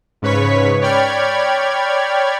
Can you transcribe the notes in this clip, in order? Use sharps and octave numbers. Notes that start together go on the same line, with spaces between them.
G#2 C#3 B4 C#5 C#6 B6
C#5 D5 G5 B5 F6 G#6